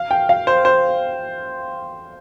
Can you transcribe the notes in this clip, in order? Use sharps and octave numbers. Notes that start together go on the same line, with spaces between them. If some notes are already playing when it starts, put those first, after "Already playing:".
Already playing: F5
G5
F5
C5
C5